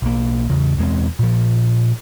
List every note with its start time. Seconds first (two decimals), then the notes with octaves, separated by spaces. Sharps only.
0.02 B1 A#3
0.50 E2 C#3
0.77 E1 E2 G#3 C4
1.19 A#2 F3